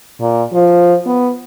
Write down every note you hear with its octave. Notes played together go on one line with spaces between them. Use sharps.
A#2
F3
B3